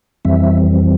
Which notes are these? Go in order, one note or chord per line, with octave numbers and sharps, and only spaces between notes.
F2 E3 G3 C4 E5